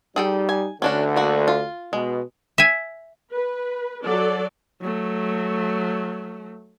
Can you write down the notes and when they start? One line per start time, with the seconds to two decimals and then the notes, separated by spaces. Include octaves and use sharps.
0.16 G3 D#4 G#4 A4 G5
0.49 G#5
0.82 D2 D3 C#4 D4 F#4
1.16 A#3 F#4
1.48 F4
1.93 B2 G#3
2.58 E5 G#5
3.31 B4
4.03 F#3 A4 D5
4.81 F#3 A3